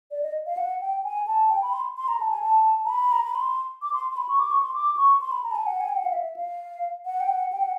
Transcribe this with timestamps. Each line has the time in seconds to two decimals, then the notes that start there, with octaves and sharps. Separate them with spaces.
0.11 D5
0.23 D#5
0.46 F5
0.57 F#5
0.81 G5
1.04 G#5
1.27 A5
1.49 G5
1.62 B5
1.73 C6
1.97 C6
2.08 A#5
2.20 A5
2.31 G#5
2.43 A5
2.85 A#5
2.89 B5
3.12 A#5
3.24 B5
3.35 C6
3.82 D6
3.93 C6
4.11 C6
4.17 B5
4.29 C#6
4.39 D6
4.51 C#6
4.63 C6
4.74 D6
4.97 C#6
5.21 C6
5.32 B5
5.44 A#5
5.51 A5
5.55 G#5
5.67 F#5
5.81 G#5
5.89 G5
5.96 F#5
6.05 F5
6.13 E5
6.36 F5
7.06 F#5
7.20 G5
7.28 F#5
7.52 G5
7.62 F#5